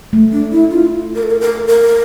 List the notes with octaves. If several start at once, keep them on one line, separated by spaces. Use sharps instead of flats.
A3
D4
E4
F4
A#4
A4
A#4
A#4
A#4